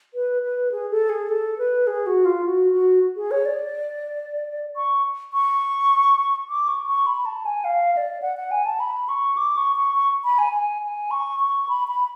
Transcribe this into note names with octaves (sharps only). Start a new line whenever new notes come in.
B4
B4
G#4
A4
G#4
A4
B4
G#4
F#4
F4
F#4
F#4
G#4
C#5
D5
C#6
C#6
D6
C#6
C#6
B5
A5
G#5
F5
F5
D5
F#5
F#5
G#5
A5
B5
C#6
D6
C#6
C#6
C#6
B5
G#5
G#5
G#5
C#6
C#6
B5
B5